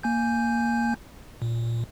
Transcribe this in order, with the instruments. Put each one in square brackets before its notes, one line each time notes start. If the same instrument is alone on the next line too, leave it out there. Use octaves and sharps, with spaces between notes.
[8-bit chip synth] A#3 G#5 G6
A#2